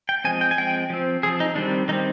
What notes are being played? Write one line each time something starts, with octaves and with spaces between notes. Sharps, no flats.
G5
F3 G#3 C4 G#5
G5
G#5
F3 G#3 C4 G5
F3 C4
F3 C4 G#4
D#4
D#3 G3 C4 D4
D#3 G3 C4 D#4